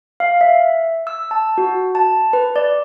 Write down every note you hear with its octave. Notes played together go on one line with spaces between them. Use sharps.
F5
E5
E6
A5
F#4
A5
B4
D5